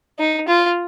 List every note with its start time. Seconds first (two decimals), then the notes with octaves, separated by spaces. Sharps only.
0.19 D#4
0.48 F4